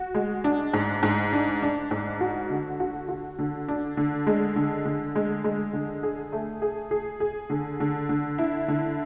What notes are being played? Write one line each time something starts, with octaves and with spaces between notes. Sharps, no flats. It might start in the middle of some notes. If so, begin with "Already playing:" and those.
Already playing: F#4
G#3
D4
G#2
G#2
D4
D4
G#2
F#4
D3
F#4
F#4
D3
D4
D3
G#3
D3
D3
G#3
G#3
D3
G#4
A3
G#4
G#4
G#4
D3
D3
D3
E4
D3